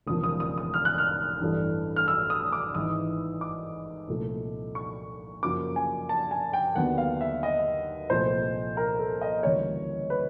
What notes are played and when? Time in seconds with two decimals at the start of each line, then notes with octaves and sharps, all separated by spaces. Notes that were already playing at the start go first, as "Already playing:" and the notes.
0.07 E1 D#2 C#3 F3 A#3 D#6
0.24 D#6
0.40 D#6
0.58 D#6
0.74 F6
0.85 F#6
0.98 F6
1.41 A1 G2 E3 A3
1.96 F6
2.08 E6
2.30 D#6
2.52 D6
2.75 G#1 G#2 E3 D#6
3.41 D6
4.08 C2 A#2 F3 A3
4.75 C#6
5.43 F#2 C#3 F3 A#3 D6
5.76 G#5
6.09 A5
6.31 G#5
6.53 G5
6.76 D#2 D3 F#3 B3 F#5
6.98 F5
7.21 E5
7.43 D#5
8.10 C2 A#2 F3 A3 C5
8.77 A#4
8.99 A4
9.21 D#5
9.43 D2 C#3 E3 G3 A#3 C#5
10.10 B4